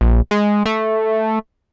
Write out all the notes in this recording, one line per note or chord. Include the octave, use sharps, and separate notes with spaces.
A#1
G#3
A3